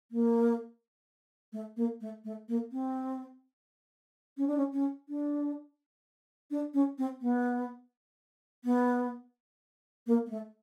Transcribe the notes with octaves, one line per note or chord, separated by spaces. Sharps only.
A#3
A3
A#3
A3
A3
A#3
C4
C#4
D4
C#4
C#4
D4
D4
C#4
C4
B3
B3
A#3
A#3
A3